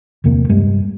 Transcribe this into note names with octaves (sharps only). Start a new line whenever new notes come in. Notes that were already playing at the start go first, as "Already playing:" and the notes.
F1 E2 C3 A#3
G2 G3 G#3